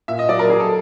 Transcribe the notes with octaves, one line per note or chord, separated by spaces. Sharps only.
A#2 E5
D#5
F#3 D5
A#4
F#3 G#4
A4